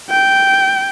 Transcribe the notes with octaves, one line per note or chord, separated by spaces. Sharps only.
G5